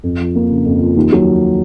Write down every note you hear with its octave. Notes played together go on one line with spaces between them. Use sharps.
F2
F3
A#3
C#3
F2
F3
D#2
F#3